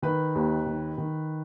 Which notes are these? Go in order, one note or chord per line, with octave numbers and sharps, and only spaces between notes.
D#3 B4
D#2
D#3
D#3